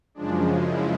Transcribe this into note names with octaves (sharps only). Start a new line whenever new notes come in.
F#2 C#3 F3 G#3 D4
E4